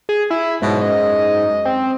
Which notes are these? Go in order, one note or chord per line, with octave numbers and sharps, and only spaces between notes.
G#4
E4
G#2 B2 F#3
F#2 D#5
C4